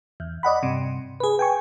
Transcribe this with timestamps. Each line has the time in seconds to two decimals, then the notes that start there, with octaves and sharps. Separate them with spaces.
0.20 E2
0.43 D5 D#5 F#5 B5
0.62 G2 C3
1.20 G#4 B4
1.39 G5 G#5 C#6